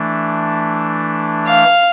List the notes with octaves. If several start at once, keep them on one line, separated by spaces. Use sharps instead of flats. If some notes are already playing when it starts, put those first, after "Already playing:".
Already playing: E3 A3 D4
F5